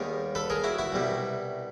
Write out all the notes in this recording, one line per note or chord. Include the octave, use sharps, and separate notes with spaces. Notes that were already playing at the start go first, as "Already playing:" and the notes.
Already playing: D#2 D#3 G3 B3 G#4 A#4
A4 B4
G#4 A#4
E4 F#4
E4 F#4
C2 B2 G3